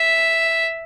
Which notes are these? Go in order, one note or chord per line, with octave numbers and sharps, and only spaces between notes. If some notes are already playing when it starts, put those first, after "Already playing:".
Already playing: E5